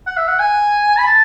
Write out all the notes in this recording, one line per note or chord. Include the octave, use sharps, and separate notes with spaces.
F#5
E5
F#5
G#5
B5
A5